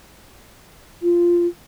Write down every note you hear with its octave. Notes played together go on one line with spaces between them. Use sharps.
F4